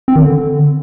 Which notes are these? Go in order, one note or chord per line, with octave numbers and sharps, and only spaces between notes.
C4
D#3
D3